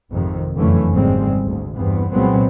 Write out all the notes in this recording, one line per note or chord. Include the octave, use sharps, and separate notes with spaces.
G#1 F2 C3 D#3
F#1 F2 D3 E3 A3 C#4
G#1 C#3 G3 G#3 C4
D2
E2 G2 B3 C4
C2 A#2 F#3 G#3 B3 C4